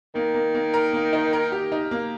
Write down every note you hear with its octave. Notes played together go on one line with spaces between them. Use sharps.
D#3 A#3
A#3
A#3
A#4
A#3
D#4
A#4
G4
D#4
A#3